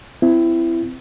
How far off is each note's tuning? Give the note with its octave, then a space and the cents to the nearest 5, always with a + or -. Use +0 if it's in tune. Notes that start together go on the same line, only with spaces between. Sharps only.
C4 -25 E4 +20